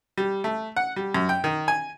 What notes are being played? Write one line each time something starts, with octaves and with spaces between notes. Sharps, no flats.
G3
A3
F#5
G3
F#2
G5
D#3
G#5